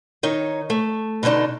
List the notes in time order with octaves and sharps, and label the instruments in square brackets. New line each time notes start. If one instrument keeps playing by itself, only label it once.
[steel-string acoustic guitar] D#3 D#4 C#5
A3
B2 D3 A3 D4 D#4